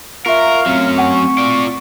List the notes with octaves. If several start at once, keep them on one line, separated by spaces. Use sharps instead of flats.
F4 A#4 E5 F5 A#5 C#6
F#3 A3 C4 C#4
F#5 G#5 C#6
F4 D5